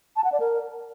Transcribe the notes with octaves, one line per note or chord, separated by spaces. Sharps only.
A5
F#5
D5
A#4